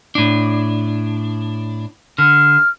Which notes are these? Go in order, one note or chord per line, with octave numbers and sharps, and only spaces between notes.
A2 D4
D3 F6